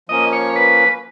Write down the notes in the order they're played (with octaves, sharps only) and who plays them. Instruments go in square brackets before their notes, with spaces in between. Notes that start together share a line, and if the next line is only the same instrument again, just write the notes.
[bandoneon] F3 A#3 C#4 [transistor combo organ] D#5
[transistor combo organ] C#5
B4